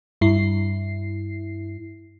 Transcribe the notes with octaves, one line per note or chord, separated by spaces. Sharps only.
G2 E4 C7